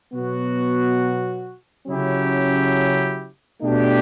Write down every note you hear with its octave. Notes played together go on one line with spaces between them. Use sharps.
B2 F#3 B3 F#4
C#3 F#3 C#4 E4 G4
B2 A3 D4 G4